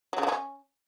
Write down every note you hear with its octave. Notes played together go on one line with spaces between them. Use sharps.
F#3
C#3
F#3
C#4